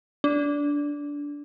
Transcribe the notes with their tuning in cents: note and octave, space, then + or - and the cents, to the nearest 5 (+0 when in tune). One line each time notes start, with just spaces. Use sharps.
D4 -15